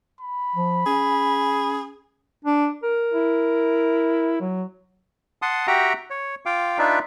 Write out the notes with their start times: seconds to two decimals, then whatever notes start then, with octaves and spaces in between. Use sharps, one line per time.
0.21 B5
0.56 F3
0.86 C#4 G#4
2.45 D4
2.83 A#4
3.14 E4
4.41 F#3
5.42 F#5 A5 C6 D#6
5.67 F#4 G4 E5 F#5 G5 A#5
6.10 C#5
6.46 F4 F5 G5 D6
6.78 D4 D#4 F4 B4 D5 E5